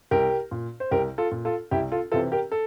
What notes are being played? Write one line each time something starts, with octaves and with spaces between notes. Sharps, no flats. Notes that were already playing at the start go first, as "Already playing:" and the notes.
C2 G4 A#4
A#2
C5
C2 G4 A#4
F4 A4
A#2
F4 A4
C2 E4 G4
F4 A4
C3 E3 F4 A4
G4 A#4
A4